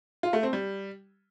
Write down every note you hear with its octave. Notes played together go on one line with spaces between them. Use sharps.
F4
A3
C4
G3